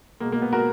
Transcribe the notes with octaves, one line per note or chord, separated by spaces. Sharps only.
B2 G#3 A#3
A#3
B3
F#4 A#4